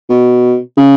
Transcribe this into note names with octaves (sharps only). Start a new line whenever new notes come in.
B2
C#3